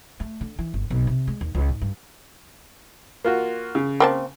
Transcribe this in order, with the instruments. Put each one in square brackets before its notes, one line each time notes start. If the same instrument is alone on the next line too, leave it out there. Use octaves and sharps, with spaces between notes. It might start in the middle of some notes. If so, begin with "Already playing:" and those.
[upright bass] A3
D3
E3
G1
B1
C3
G#3
D#2
C#2
G#2
G2
[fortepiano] A#3 F4 F#4
C#3
[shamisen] A#3 C4 A5